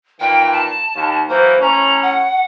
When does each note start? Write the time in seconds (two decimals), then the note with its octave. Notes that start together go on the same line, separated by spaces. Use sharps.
0.20 A#2 D#3 E3 G5
0.52 A5
0.96 D#2
1.29 E3 F#3 A#3 C5
1.61 A2 C#4 A#5
2.02 F#5